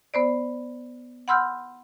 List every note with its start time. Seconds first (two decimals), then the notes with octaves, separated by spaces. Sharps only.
0.14 B3 C5 D5
1.28 F#5 B5 C6 E6 F6 G6